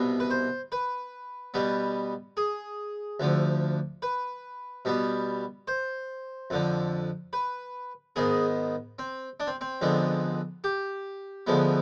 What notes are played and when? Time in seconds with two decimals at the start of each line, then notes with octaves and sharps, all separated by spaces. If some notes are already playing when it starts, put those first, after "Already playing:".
Already playing: C2 B2 B3
0.20 B4
0.30 C5
0.72 B4
1.54 B2 G3 B3
2.37 G#4
3.20 D2 D3 F3
4.02 B4
4.85 B2 G3 B3
5.68 C5
6.50 F2 D3 F3
7.33 B4
8.16 G#2 D#3 B3 G#4
8.99 C4
9.40 D4
9.47 C4
9.61 C4
9.81 F2 D3 G#3 B3
10.64 G4
11.47 D2 D3 F3 G#3 B3